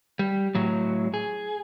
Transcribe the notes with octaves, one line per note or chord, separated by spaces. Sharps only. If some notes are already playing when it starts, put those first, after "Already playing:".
G3
A2 F#3
G#4